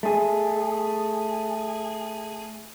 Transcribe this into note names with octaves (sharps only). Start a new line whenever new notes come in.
A3 G#4